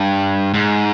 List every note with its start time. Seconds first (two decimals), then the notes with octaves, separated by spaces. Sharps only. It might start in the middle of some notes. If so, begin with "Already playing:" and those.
Already playing: G2
0.54 G#2